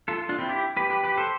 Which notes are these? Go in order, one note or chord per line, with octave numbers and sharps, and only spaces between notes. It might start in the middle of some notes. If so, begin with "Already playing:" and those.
F4 A4
D4 F4
C4 E4
E4 G4
G4 B4
G4 B4
G4 B4
A4 C5